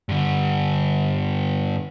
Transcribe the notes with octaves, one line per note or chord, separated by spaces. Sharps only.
G2 D3